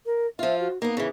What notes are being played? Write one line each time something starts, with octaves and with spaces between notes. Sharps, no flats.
A#4
F3 F4 E5
F#4
A#3 B3 D#4
C#3 E3